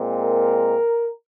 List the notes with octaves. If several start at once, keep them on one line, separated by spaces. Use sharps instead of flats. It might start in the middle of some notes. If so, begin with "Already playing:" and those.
Already playing: A#2 G#3 C4
A#4